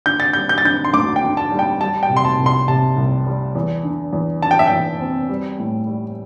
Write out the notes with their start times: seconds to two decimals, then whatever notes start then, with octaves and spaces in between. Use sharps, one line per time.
0.06 D3 G6
0.20 A6
0.33 G3 G6
0.49 G6
0.58 A6
0.65 D3 G6
0.84 C6
0.93 D2 D6
1.16 G5
1.23 D3
1.37 A5
1.52 G3
1.59 G5
1.81 G3 A5
2.03 G5
2.10 C3
2.17 C6
2.25 A5
2.39 C2
2.46 C6
2.68 C3 A5
2.97 C2
3.26 G3
3.55 E2
3.84 D3
4.13 E2
4.42 D3 A5
4.51 G5
4.59 E5
4.67 E2 G5
5.00 C4
5.29 G3
5.59 A2
5.87 G3